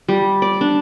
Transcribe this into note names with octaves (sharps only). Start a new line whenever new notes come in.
G3
D5
D4